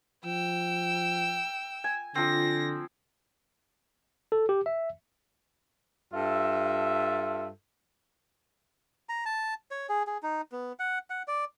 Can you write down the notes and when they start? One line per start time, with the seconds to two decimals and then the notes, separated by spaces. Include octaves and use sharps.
0.25 F3 G5 E6
1.84 G#5
2.15 D3 F3 C4 A#6
4.32 A4
4.49 G4
4.66 E5
6.12 G2 F4 A4 E5
9.09 A#5
9.26 A5
9.71 C#5
9.89 G#4
10.07 G#4
10.23 D#4
10.52 B3
10.79 F#5
11.10 F#5
11.28 D5